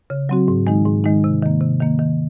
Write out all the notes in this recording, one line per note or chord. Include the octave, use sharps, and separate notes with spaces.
C#3
F#3 C4 F#4
G#2
D#3 G#3 D#4
G#2
D#3 G#3 D#4
C3
D#3 A#3
C3
D#3 A#3
D#3